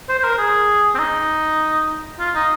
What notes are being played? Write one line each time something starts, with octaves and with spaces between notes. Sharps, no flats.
C5
C5
A#4
G#4
C4
D#4
F4
D#4